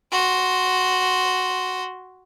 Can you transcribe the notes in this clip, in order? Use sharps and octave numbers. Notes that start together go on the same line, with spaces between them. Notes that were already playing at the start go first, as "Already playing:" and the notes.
F#4 C6